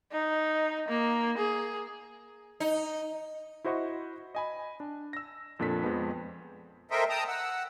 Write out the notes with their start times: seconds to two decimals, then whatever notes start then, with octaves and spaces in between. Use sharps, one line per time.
0.12 D#4
0.88 A#3
1.38 G#4
2.60 D#4
3.64 E4 F#4 C5 D#5 F#5 C#6
4.35 D#5 G#5 B5
4.80 D4
5.13 E6 A#6
5.59 F2 A#2 D4 A4 B6
5.83 F2 G#3 B3
6.91 A4 A#4 C5 D#5 E5 G5
7.10 G5 A5 A#5 D#6
7.28 F#5 E6